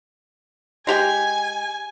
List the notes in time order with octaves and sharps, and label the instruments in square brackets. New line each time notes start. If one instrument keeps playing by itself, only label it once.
[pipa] G#3 G4 G5 [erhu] G#5